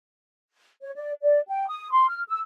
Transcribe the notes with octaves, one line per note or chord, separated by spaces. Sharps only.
C#5
D5
D5
G5
D#6
C6
F6
E6